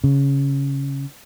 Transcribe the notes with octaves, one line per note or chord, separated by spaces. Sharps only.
C#3